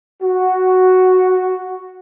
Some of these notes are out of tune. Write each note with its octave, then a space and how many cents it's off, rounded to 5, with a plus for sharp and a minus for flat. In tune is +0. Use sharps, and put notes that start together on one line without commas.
F#4 +0